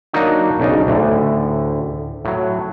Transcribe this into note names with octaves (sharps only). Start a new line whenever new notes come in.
F#3 A#3 D4 D#4 F#4
B1 C#3 D4 D#4
D2 A2 D3
A2 F#3